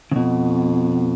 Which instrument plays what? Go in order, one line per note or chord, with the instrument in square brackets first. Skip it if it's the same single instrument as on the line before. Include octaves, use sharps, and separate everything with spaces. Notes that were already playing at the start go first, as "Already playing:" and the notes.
[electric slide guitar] C#3
[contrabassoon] F2 [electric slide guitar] B2